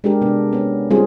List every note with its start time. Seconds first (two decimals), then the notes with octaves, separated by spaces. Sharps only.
0.04 G#3 D4 G4 A#4
0.21 C3 B3 D4
0.53 B3 C#4
0.91 G3 C4 C#4 F4 G#4